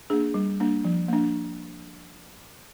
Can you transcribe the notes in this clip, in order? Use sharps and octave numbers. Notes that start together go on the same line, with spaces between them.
A#3 D4 G#4
G3
A#3 D4
F3
A#3 D4